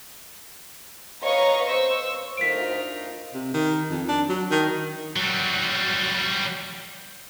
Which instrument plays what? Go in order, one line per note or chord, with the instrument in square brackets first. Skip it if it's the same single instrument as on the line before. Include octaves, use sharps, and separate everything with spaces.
[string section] B4 C#5 D#5 F5 A#5 C#6
C5 C#6 E6
[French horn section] D2 A#4 C5 [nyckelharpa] D#4 F4 [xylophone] B6 D7
[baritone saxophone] C3
D#3
F2
D4
F#3
D#3
[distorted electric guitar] F#3 G3